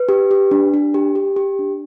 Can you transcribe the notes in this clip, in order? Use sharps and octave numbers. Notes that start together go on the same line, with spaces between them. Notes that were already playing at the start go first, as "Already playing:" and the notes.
Already playing: B4
G4
G4
D4
D4
G4
G4
G4
D4